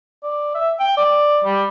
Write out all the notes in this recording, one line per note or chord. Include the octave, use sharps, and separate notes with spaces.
D5
E5
G5
D5
G3